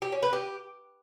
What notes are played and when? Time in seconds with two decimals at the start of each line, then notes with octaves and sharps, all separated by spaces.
0.02 G4
0.12 C#4
0.23 B4
0.33 G4